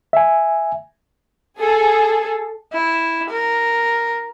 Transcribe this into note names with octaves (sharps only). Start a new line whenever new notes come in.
E5 G#5
G#4 A4
E4
A#4